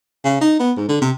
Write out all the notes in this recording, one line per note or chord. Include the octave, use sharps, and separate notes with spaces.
C#3
D#4
B3
G#2
D3
C3